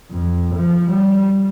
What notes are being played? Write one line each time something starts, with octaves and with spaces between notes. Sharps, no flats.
F2
F3
G3